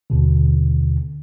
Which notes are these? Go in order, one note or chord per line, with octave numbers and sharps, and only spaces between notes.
D#2 B2 D3